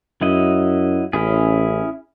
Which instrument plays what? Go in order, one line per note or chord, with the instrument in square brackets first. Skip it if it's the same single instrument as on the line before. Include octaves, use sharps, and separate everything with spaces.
[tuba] F#2 [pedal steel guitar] F#3 E4 D#5
[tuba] A1 [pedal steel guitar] C#4 E4 G#4